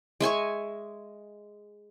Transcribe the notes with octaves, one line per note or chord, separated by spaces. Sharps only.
G#3 E5 G#5 C#6